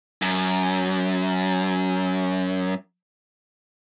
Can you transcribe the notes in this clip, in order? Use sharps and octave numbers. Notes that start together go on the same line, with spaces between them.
F#2